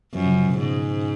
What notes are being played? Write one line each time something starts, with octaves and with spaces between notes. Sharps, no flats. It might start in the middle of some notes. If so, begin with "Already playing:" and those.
F#2 F3
C#3
C#3
B2
G#2 C#3